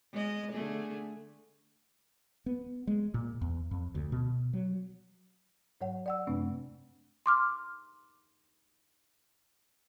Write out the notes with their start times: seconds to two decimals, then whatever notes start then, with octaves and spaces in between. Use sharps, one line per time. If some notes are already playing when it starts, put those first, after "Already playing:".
0.13 G#3 D#5
0.52 D3 A3 G#4
2.46 B3
2.87 G#3
3.14 A#2
3.41 E2
3.71 F2
3.95 D2
4.12 B2
4.53 F#3
5.81 G#2 F#3 C#5 F#5
6.06 D5 F#5 E6
6.27 F#2 C3 A3 C4 D4
7.26 C6 D6 F6